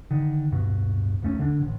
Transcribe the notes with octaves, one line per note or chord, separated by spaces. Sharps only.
D3 D#3
D1 G2 B2
A#1 D#2 A3 C#4
D3 D4
A1